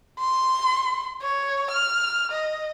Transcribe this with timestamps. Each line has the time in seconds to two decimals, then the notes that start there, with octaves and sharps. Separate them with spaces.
0.19 C6
1.22 C#5
1.70 F6
2.32 D#5